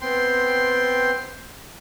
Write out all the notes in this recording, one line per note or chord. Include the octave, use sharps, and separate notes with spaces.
B3 C4 G5 C6